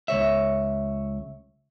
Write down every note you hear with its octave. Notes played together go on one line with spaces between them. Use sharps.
C#2 C#5 E5